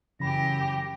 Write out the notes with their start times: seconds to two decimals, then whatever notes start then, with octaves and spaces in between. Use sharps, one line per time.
0.20 F#2 C#3 E3 G4 B5 A#6